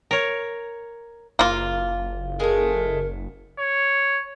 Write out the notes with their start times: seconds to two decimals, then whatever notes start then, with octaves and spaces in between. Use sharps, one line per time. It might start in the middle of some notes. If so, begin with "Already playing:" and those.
0.11 A#4 C#5
1.39 F#1 A#3 F4
2.40 G#3 A3 A#4
3.59 C#5